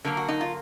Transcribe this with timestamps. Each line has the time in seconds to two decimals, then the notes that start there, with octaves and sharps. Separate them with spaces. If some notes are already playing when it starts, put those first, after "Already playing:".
0.05 D3 F#3 A#3 A#4
0.17 F#4
0.28 D#4
0.41 F4